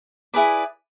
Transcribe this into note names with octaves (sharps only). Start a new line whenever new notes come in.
E4 G#4 B4 D5